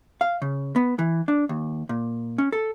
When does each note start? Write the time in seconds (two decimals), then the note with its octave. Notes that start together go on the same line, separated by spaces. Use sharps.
0.21 F5
0.42 C#3
0.76 B3
0.99 E3
1.28 D4
1.49 D#2
1.89 A#2
2.38 C#4
2.52 A4